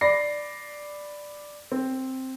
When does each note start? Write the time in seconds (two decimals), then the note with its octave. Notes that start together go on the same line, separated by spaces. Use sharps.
0.01 D5 B5 A#6 C7
1.72 C4